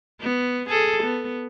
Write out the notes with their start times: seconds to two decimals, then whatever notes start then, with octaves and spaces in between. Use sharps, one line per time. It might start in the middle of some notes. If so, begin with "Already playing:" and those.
0.21 B3
0.70 G#4 A4
1.04 B3